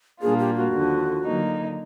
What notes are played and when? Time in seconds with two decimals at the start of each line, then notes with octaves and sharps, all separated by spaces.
0.21 A#2 G3 A#3 D4 F4 G#4
0.39 G4
0.55 F#4
0.72 D#2 D3 F3
1.24 D3 F#3 A#3 D#4